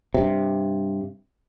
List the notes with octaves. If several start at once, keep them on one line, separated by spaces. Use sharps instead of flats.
G2 C3